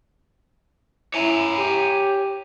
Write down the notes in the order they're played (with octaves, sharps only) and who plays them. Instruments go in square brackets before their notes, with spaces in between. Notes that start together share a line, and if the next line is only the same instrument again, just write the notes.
[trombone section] C#4 E4 [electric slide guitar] C#5 G#5 A#5
[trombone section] G4